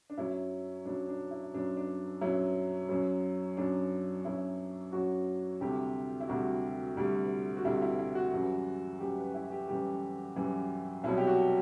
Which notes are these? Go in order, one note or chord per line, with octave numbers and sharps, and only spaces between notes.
D4
F#2 F#3 E4
F#2 F#3 D4
D4
E4
F#2 F#3 D4
D4
F#2 F#3 E4
F#2 F#3
F#2 F#3 D4
F#2 F#3 E4
F#2 F#3 F#4
D2 C3 G3 G4
E4
D2 C3 G3 F#4
D2 C3 G3
F#4
D2 C3 G3 E4
E4
E4
F#4
F#2 E3 G3
F#2 E3 G3 G4
B4
E4
G4
F#2 E3 G3 G4
F#2 E3 G3
C2 B2 F#3 E4
G4
F#4